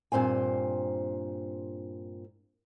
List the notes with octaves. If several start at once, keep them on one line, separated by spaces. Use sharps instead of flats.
G2 A#2 C4 C5 G#5